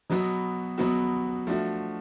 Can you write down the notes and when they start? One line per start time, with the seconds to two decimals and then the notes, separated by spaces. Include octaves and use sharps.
0.10 B2 F#3 B3 F#4
0.78 B2 F#3 B3 F#4
1.47 F3 A3 D4 F#4